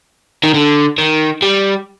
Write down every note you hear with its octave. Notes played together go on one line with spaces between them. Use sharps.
D#3
D3
D#3
G3